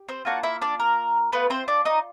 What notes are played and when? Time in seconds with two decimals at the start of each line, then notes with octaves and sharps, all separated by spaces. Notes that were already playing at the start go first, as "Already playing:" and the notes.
Already playing: G4
0.09 C4 C5
0.25 A#3 D4 F4 F#4 F#5
0.43 E4 E5
0.62 D4 D5
0.80 A#4
1.32 A3 B3 F4 B4
1.50 C4 C5
1.68 D4 D5
1.85 D#4 D#5